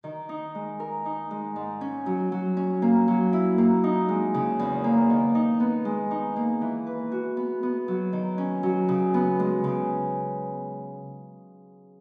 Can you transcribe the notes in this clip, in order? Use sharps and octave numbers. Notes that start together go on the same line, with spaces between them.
D#3
D#4
G#3
A#4
D#4
G#3
G#2
C#4
F#3
F#3
C#4
A#3
F#3
E4
A#3
D#4
G#3
C#3
E2
A#3
D#3
D#4
B3
G#3
D#4
A#3
E3
B4
F#4
B3
B3
F#3
D#3
C#4
F#3
C#3
B3
G#3
C#3